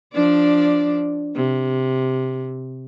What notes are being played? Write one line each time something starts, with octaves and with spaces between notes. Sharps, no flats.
F3 D4 D5
C3